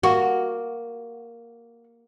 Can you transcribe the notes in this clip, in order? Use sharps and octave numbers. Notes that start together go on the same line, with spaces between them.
A#3 F#4